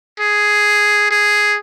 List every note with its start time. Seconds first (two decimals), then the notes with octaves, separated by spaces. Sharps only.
0.20 G#4
1.11 G#4